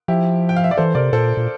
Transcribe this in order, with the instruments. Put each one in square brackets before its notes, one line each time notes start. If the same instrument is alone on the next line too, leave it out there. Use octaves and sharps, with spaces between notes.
[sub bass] F3 [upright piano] E4 G4
[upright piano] G5
F5
E5
D5
[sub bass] E3 [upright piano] A4 C5
[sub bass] C3 [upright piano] A#4 D5
[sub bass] A#2 [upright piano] A4 C5
[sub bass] A#2